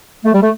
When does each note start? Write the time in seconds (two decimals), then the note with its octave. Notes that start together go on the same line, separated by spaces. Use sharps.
0.24 A3
0.33 G3
0.41 A3